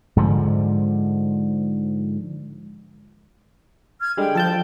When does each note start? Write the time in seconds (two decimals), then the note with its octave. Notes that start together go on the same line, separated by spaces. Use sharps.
0.16 G#2 D3 F3
4.00 F6 G#6
4.17 D3 G3 G#3 G5
4.35 F3 A4 A5 G6